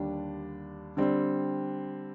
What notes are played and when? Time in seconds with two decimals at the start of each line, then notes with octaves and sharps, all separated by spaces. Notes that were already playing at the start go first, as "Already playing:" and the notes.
Already playing: D#2 D3 G3 D4
0.97 D3 G3 C4